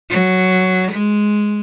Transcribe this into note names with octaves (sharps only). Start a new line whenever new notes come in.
F#3
G#3